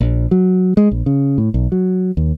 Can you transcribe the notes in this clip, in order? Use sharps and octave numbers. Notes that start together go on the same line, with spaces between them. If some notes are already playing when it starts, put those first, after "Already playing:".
A#1
F#3
G#3
A#1
C#3
A2
B1
F#3
D#2